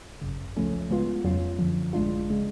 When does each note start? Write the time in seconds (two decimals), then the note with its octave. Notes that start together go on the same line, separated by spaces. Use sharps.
0.22 G#1 F#2 C#3
0.57 C#2 C#3 F3 A3 C#4
0.90 C#3 G#3 B3 F4
1.24 F2 C#3 F#3 C#4 F4
1.59 F#2 D3 F3
1.93 A1 A2 G#3 D4 F4
2.30 C#3 G#3